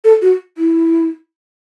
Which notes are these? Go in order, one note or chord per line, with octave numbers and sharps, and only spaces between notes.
A4
F#4
E4